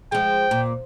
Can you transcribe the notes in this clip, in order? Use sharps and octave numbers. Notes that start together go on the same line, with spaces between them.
F3 G#3 G5
A#2